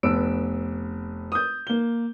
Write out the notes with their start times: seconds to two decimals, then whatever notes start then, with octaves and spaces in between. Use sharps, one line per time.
0.03 F1 B3 E6 D7
1.32 D#6 G6
1.67 A#3 G7